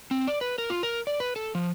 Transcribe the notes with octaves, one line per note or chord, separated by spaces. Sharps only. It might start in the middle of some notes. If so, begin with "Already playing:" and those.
C4
D5
B4
A#4
F4
A#4
D5
B4
A4
F3